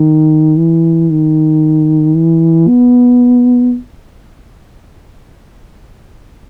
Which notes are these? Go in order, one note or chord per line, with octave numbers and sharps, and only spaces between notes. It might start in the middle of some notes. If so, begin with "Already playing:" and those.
Already playing: D#3
E3
D#3
E3
B3